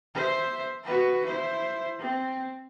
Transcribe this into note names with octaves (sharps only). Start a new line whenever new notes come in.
C5 E5
F#4 B4
E4 C5
C4